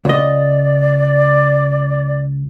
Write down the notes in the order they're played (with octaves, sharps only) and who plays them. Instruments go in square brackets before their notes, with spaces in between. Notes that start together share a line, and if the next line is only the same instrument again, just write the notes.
[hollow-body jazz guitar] C#2 D#5 [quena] D5